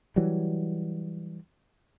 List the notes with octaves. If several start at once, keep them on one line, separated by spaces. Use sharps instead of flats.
E3 F#3 G3